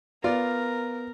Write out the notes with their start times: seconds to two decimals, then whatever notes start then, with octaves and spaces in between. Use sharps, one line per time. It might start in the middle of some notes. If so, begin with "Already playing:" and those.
0.24 B3 F4 A#4 D5